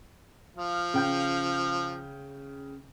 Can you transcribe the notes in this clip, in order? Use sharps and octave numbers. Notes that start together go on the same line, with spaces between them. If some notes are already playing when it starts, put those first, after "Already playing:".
F3 F5
C#3 G5 G6